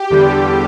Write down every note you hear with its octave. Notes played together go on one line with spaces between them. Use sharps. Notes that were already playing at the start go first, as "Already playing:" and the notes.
Already playing: G4
E2 D3 G3